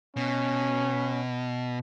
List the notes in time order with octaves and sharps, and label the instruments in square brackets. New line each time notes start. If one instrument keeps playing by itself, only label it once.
[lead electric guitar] B2 [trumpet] C#4